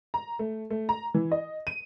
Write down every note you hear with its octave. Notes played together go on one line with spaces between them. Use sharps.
A#5
A3
A3
A#5
E3
D#5
D#7